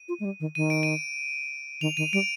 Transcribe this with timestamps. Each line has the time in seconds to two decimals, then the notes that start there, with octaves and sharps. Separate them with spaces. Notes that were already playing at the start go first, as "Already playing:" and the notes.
Already playing: D#7
0.08 F4
0.20 G#3
0.25 G3
0.40 D#3
0.55 D#3 D#7
0.70 D7
0.83 D#7
1.81 D#3 F7
1.97 D#3 D#7
2.13 G3 D7